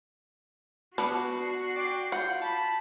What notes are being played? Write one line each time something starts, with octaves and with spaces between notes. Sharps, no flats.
B3 D4 F#4 C7
D5 G5
F4 F#5 G6
A5 B5